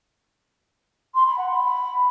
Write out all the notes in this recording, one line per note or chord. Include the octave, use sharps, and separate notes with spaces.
C6
B5
F#5
B5